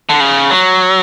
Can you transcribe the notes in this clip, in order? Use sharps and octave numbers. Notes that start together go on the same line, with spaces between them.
D3
C#3
F#3